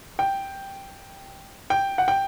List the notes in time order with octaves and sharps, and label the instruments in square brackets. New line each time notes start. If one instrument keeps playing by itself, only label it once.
[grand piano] G5
G5
F#5
G5